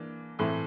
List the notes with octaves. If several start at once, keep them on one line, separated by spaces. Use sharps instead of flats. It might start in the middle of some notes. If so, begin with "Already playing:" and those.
Already playing: E3 A#3 D4
A2 E3 A3 C4 E4